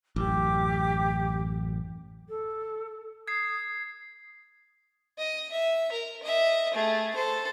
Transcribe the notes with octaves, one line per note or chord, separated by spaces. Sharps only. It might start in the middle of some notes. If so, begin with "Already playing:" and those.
A1 F#2 G4 D6
A4
D#6 G#6 C7
D#5
E5
A#4
D#5 E5
A3 G#4
A4 C5